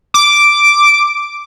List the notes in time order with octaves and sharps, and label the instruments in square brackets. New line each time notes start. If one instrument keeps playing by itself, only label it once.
[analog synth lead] D6